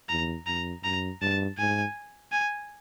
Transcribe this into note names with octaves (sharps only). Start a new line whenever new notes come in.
E2 A#5
F2 A#5
F#2 A#5
G2 A5
G#2 G#5
G#5